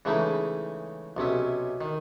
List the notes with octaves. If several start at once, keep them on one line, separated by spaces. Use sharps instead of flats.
C#3 E3 G#3 A3 D#4 E4
B1 C3 C#4 E5
D#3